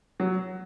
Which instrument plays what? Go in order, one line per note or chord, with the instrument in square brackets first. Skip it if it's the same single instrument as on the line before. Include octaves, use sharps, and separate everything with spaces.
[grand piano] F#3